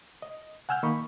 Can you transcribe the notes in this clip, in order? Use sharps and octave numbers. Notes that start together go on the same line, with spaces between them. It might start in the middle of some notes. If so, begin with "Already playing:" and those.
D#5
F#5 G#5 E6 F6 G6
D#3 A#3 D#5 B5 C#6